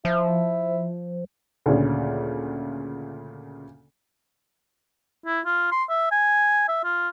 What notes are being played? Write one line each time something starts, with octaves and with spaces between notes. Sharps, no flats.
F3 E4
D2 A#2 C#3
E4
F4
C6
E5
G#5
E5
F4